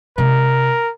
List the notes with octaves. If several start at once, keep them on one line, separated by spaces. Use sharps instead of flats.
C3 G#3 A#4